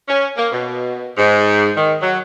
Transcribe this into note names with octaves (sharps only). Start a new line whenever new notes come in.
C#4
A#3
B2
G#2
D#3
F#3